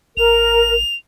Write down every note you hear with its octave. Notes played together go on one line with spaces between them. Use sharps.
A1 A#4 F7